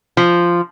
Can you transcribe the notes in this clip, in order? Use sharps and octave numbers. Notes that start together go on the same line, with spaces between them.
F3